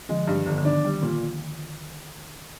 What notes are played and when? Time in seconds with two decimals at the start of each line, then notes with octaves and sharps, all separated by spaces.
0.09 D3 F3 G#3
0.27 G2
0.36 D#3
0.47 G1 D3
0.58 D3
0.65 D#3 D4
0.84 G3
0.94 D#3
1.02 A#2